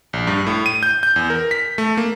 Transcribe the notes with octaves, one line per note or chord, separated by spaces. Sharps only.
A#1
G2
A2
D#7
G6
G6
E2
A#4
B6
A3
A#3